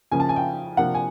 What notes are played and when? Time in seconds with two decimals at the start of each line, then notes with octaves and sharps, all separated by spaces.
0.12 C#3 F3 A#3 C#4 G#5
0.20 A5
0.29 G#5
0.36 G5
0.77 C3 F3 A#3 D4 F#5
0.95 G#5